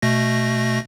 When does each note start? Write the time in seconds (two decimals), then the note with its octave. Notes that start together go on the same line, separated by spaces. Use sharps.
0.02 B2 A3 A#6